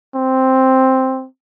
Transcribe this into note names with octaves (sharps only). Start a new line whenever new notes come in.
C4